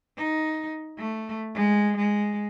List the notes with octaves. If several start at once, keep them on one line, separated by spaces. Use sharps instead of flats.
D#4
A3
G#3
G#3